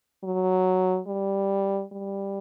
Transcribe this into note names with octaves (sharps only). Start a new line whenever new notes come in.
F#3
G3
G3